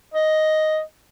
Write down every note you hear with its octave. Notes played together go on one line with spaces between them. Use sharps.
D#5